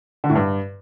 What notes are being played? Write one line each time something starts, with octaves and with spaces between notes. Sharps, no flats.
D3
A2
G2